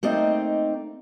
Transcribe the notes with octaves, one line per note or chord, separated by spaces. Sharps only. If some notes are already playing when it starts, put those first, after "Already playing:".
A3 A#3 C4 D#4 D5 D#5